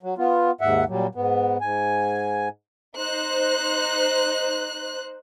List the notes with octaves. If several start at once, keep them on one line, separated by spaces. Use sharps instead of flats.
F#3
B3 F4
D#2 G#2 E5 F#5
A#2 F#3 G3
G#2 B3
G#2 G#5
D#4 C5 F#6